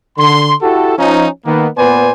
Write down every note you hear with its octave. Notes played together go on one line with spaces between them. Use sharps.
D3 C6
E4 F#4 G4 A4
F3 C#4 D#4
D#3 A#3 B3
A#2 B3 B4 C5 D5 G#5